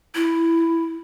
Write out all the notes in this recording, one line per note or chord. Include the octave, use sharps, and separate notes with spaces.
E4